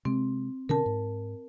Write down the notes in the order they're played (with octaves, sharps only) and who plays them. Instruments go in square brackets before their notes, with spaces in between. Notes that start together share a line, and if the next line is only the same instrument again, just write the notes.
[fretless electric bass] C3 G#3 [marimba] C4
[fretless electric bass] B2 D3 C#4 [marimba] A#4 A5
[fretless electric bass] G#2